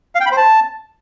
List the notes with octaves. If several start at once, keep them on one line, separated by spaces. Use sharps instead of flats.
F5
G5
B5
C5
A5